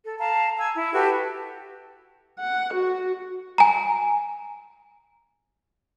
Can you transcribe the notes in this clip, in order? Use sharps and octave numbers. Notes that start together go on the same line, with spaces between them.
A4
F5 A5 A#5
G#5 E6
E4
F#4 G4 A4 B4
F#5
F#4
G#5 A#5